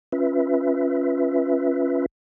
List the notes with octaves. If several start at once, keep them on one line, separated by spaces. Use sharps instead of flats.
C#4 F4 B4 E5